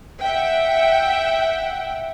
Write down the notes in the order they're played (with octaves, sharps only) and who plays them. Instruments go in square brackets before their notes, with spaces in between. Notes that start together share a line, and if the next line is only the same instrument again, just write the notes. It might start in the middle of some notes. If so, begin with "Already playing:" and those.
[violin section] E5 F#5 G5